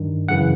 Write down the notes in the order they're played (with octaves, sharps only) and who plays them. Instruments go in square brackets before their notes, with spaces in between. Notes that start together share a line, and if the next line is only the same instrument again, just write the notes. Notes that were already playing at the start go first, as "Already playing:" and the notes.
Already playing: [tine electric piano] G2 D#3
F#2 C#3 E3 F#5